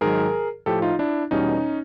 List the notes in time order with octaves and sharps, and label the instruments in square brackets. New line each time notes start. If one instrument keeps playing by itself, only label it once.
[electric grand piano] G#2 D#3 F#3 G#4 A#4
A2 F3 G4 A4
D#4 F4
D4 E4
E2 B2 G3 C#4 D#4